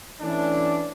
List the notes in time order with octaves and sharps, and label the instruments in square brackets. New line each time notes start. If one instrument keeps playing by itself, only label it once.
[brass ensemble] E3 A3 C#4 D4